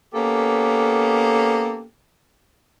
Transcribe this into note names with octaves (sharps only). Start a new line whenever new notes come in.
A#3 B3 C#4 G4 A4